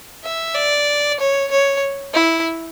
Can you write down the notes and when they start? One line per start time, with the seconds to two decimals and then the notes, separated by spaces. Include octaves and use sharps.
0.24 E5
0.55 D5
1.19 C#5
1.51 C#5
2.14 E4